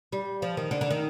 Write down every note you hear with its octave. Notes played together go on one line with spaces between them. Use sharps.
G3
F3
D#3
D3
D3
D#3